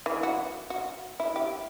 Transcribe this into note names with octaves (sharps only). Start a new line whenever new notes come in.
E3
F#4
F#4
E4
G4